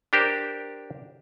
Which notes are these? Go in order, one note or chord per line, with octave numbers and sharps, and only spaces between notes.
D4 G4 A#4 C5